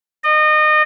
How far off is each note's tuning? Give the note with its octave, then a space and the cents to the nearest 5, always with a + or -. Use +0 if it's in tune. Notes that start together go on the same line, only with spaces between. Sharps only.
D#5 -30